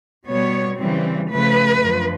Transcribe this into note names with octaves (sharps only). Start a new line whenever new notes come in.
B2 G3 B3 C#5
C#3 E3 G3 C4
C#3 F3 A3 B4
F#2 D3 F3